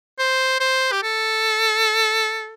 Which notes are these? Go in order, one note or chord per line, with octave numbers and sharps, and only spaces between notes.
C5
C5
G4
A4